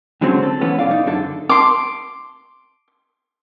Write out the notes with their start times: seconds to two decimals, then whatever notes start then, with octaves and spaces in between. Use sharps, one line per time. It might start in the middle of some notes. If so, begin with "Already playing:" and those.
0.21 G#2 D3 F#3 C4 C#4
0.43 A4
0.61 E3 A3 B3 C#4
0.79 B1 D5 F5
0.91 D#4
1.06 F#2 D3 A4
1.49 C6 D6